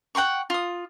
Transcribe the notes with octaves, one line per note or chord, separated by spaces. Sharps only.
F#5 G5 C6 C#6
F4 D#6